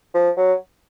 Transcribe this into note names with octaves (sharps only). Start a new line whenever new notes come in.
F3
F#3